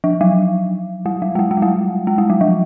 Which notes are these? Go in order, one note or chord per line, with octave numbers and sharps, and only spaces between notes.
F3
F#3
G3
F#3
G#3
G3
G#3
F#3
G3
G#3
G3
F#3
F3